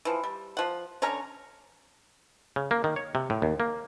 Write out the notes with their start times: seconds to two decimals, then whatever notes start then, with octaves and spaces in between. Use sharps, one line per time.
0.05 E3 F3
0.23 G3
0.57 F3 F#5
1.02 D3 C#4 C#5 A#5
2.56 C#3
2.71 A#3
2.84 D#3
2.96 C#5
3.15 C3
3.30 A2
3.42 D#2
3.60 A#3